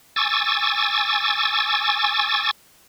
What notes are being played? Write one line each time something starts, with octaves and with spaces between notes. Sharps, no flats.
G#5 C#6 D6 E6 A6